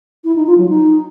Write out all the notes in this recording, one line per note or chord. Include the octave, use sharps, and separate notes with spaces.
E4
D#4
F4
F#3
D#4